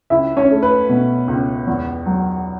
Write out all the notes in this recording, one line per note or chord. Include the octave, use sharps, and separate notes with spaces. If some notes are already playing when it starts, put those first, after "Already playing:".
C#2 E4 E5
C#4 C#5
A3
B4
B2
C#2
E2
F#3